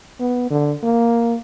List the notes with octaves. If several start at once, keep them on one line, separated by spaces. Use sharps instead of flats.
B3
D3
A#3